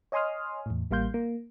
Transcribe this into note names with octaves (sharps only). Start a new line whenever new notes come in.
C#5 D#5 G#5 C6 D#6 F6
E2 A2
A1 G3 A#3 F5 C6 G6
A#3